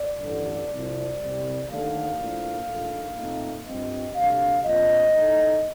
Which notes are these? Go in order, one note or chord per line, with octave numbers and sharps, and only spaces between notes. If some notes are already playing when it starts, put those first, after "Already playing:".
Already playing: D5
A1 G2 D3 A3
C2 C3 F3
C2 C3 G3
D#2 D3 A3 F5
A2 F3 A#3 D4
A#1 A#2 A3 D#4
A#2 A3 C4 D#4
G2 F3 C4 D#5
D2 C3 G3 D4 F5
A#1 A#2 F3 C4 D#5
A2 A3 D#4